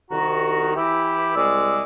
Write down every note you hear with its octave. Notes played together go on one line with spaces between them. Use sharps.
C2 D#3 F#4 A#5
E3 E4 G4
C2 G#3 D5 E6